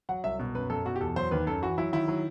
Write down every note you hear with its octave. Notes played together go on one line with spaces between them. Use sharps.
F#3 F#5
C2 E5
B2
F#2 B4
F#2 A4
B2 F#4
G4
E2 A4
F#3 C5
D#2 B4
F#2 A4
E3 F#4
F#3 E4
D#3 E4
F#3